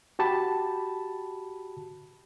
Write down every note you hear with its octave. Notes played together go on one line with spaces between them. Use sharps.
F#4 G4 A5 B5